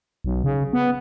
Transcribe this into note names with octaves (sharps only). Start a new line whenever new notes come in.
B1
C#3
B3